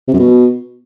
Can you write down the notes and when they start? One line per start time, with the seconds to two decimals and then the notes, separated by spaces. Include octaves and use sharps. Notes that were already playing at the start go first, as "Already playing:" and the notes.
0.08 C3
0.14 F#2
0.19 B2